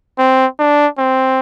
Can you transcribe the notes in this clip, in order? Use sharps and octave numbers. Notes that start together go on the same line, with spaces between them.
C4
D4
C4